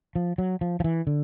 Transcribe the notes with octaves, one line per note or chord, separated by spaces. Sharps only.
F3
F#3
F3
F3
E3
D3